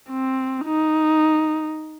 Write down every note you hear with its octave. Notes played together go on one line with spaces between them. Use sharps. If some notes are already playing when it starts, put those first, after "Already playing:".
C4
D#4